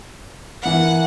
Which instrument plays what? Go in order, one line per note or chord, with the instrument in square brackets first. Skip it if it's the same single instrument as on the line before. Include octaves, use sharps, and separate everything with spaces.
[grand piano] E3 A#4 [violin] F#5